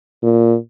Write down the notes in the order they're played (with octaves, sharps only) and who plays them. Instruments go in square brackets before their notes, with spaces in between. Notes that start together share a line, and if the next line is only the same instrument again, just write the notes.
[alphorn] A#2